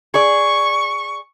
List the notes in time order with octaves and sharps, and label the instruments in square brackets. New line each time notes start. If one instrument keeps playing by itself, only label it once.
[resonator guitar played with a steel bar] G#4 D5 [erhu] C#6